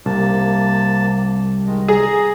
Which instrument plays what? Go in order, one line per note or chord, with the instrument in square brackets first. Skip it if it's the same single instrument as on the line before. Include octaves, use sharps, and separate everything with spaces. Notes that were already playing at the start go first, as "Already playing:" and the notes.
[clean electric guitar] C2 [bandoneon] C3 A#3 A5
[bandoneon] D#3 G#3
[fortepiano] G#4 [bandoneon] A#5